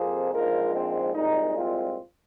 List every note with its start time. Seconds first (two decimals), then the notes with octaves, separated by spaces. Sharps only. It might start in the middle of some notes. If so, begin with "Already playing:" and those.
Already playing: F2 C3 F3 A#3 G#4 C5
0.32 A#1 G#2 F3 G#3 F4 A#4
0.73 C4
1.15 C2 A#2 G#3 D#4
1.56 C4 F4